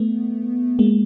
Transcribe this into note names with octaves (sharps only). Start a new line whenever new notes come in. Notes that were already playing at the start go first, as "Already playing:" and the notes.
Already playing: A3 B3
G#3 A#3